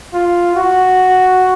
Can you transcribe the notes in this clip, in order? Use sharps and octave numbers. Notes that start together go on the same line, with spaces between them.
F4
F#4